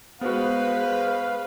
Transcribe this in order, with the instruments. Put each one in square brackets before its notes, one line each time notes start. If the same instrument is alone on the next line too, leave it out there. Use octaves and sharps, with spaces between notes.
[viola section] G#3 B4 [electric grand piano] B3 F#4 [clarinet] C5 [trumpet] F5